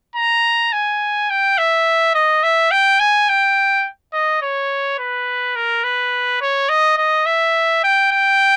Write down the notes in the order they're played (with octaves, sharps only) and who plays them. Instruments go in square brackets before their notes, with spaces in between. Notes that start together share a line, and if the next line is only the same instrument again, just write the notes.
[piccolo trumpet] A#5
G#5
G5
E5
D#5
E5
G5
G#5
G5
D#5
C#5
B4
A#4
B4
C#5
D#5
D#5
E5
G5
G5